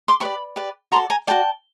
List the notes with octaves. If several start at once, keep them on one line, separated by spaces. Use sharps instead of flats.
C6 D6
G4 B4 D5 B5 C#6
G4 B4 D5
F#4 A4 D5 A#5 C6
G#5 A#5
F#4 A4 D5 G5 A5